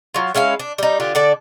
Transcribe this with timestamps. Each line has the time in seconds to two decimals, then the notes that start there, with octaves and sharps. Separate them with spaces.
0.14 F#3 F4
0.35 G#3 C#4 E4 F5
0.60 D4
0.78 G3 D#4
1.00 D3 F4 G4
1.15 D3 A4 D5